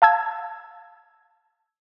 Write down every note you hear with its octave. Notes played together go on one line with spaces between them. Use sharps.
F5 A5 E6 G#6